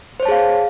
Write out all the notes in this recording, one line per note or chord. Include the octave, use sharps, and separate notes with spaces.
G#4 C5 C#5 F5 A5